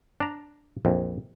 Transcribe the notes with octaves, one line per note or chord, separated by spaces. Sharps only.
D4 A#5
A#1 F2